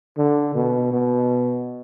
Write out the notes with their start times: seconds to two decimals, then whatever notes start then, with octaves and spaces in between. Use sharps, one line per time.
0.18 D3
0.55 B2
0.92 B2